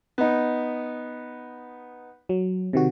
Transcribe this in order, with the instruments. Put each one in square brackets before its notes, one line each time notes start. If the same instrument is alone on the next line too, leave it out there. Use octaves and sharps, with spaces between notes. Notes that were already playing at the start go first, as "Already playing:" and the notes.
[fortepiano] B3 D#4
[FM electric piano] F#3
C3 D#3 F#4